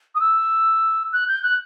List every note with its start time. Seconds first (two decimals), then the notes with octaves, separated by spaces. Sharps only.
0.15 D#6
0.20 E6
1.12 F#6
1.28 G6
1.43 F#6